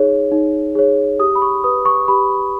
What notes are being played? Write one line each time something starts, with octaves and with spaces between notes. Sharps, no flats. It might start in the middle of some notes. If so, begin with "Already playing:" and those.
Already playing: D#4 G#4 C#5
D#4
G#4 C#5
G4 D#6
B5
C#6
B4 D#6
C#6
G4 B5